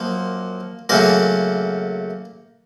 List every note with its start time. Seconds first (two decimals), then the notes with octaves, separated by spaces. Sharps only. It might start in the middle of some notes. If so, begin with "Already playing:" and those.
Already playing: F#2 F3 A#3
0.89 F#2 C#3 A3 A#3 A#4